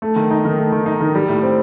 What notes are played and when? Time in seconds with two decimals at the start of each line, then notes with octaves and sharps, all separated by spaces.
0.02 A3
0.16 D#3
0.31 D#4
0.45 D#3
0.58 A3
0.72 D#3
0.86 D#4
1.00 D#3
1.15 G3
1.29 A2
1.43 C4